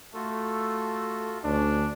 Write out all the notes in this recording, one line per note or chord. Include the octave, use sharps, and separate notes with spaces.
A3 F4 F#4 A4
D2 C#4 D4